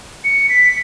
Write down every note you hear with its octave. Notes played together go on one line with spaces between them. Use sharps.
C#7
B6